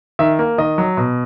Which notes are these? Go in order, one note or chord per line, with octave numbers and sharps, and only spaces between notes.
D#3 E5
A#3
D#3 D#5
F#3
B2